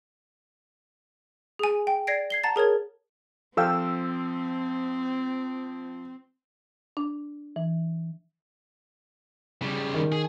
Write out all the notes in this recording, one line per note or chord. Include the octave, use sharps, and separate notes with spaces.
G#4 G#5
G5
D5 G#6 A#6 C7 D7
G#6 C7 G7
F#5 A5 A#5 A6
G#4 A#4 C#5 G#6
F3 C4 A4 F5 G5 E6
D4
E3
C#3 G3
D#3
G#4